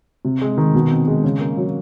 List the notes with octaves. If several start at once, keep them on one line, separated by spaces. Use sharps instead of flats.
C3
G#3
D#3
B2
C4
G#3
C#3
A#3
F#3